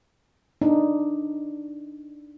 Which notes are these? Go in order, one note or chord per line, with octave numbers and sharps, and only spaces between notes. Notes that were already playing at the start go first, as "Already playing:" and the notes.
D4 D#4